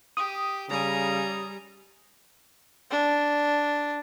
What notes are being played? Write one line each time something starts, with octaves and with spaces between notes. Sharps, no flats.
G4 D#6
C#3 G3 G#5 A#5
D4